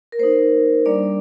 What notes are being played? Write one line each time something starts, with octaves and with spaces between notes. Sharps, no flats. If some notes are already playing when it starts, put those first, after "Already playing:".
A#4
A#3 D#4 C5
G3 A#3 D4 D5